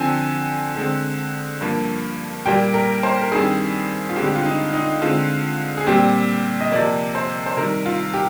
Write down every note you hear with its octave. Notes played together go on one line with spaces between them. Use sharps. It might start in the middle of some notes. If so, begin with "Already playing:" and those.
Already playing: D3 F3 C4 G#5
D3 G#3 C4
G2 F3 A#3
A#2 G3 A#3 G5
A#4
C5
A#4
G2 D#3 G3 C4 G#4
F4
G2 D3 G#3 C4 G4
G4
F4
D#4
D#4
D3 G#3 C4 F4
G#4
A#2 G3 C4 G4
D#5
C3 F3 A#3 D5
C5
C5
C3 D#3 G3 A#4
F4
G4